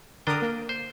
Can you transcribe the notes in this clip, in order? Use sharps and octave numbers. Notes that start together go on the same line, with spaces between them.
D3 D4 A#4 G5 D#6
A#3
C5